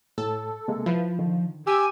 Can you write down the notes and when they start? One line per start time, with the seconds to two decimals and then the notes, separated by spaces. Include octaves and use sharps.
0.18 A2 A4
0.68 C3 G#3 A#3
0.86 F3 E4 B4 B5
1.19 D3 D#3
1.67 G4 G#5 E6